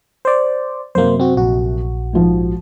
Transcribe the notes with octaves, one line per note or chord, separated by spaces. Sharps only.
C5 D5
F#2 C3 A#3 C5
C4 F#4
A#1 F#4
G#2 F3